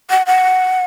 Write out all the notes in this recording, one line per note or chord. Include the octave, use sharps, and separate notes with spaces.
F#5
F#5